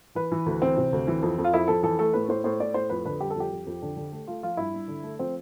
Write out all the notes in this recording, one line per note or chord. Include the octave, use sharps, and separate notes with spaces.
E3 B4
E3
D2
E3 C4
C3
D2
E3
F2
F2
F4
F2 E4
F2 A4
E3 A4
A3 A4
A2 B4
A2 C5
A2 C5
A2 D5
A2 C5
F2 B4
D3 B4
G3 G4
A4
F2 G4
F2
F2
D3
D3
A3
A3 F4
F3 F4
G2 E4
G2
D3
A3
F3 C4